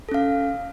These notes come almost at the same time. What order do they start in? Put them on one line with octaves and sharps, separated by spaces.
A4 C#4 F5